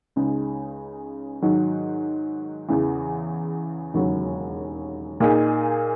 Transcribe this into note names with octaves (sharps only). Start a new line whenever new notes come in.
C#2 C#3 G#3 D#4
G#2 D#3 F#3
E2 C#3 E3
E1 D#2 C#3 F#3
A#2 A#3 D#4 G#4